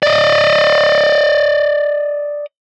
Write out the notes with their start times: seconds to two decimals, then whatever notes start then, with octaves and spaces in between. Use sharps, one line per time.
0.03 D5 D#5